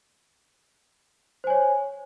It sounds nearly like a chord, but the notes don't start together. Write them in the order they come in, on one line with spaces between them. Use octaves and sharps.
C5 G#5 C#5